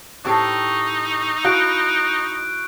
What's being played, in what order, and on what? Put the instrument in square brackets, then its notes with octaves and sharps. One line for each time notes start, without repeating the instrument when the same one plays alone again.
[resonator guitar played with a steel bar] A2 C4 G4 [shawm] D#4 [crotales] C#6 E6 C7
[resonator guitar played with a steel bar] E4 F#4 F5 [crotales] F#6 G6 D7